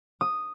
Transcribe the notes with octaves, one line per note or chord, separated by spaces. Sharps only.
D#6